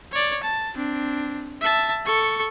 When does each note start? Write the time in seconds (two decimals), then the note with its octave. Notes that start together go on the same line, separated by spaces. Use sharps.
0.12 C#5 D5
0.43 A5
0.75 C4 D4
1.61 E5 A5
2.05 A4 C#6